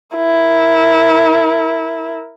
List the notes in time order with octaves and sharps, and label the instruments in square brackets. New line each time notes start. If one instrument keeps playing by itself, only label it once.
[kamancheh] E4 A#4